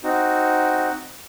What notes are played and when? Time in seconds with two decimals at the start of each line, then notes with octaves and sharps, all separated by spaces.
0.04 C4 D#4 F#4